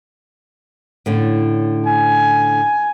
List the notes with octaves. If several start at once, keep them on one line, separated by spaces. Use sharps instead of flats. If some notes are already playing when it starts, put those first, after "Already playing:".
A2 D3 C#4
G#5